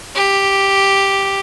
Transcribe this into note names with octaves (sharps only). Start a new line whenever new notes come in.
G4